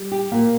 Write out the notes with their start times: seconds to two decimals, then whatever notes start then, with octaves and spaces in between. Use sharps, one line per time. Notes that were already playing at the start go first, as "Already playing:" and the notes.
Already playing: G3
0.12 G4
0.32 A#2 A#3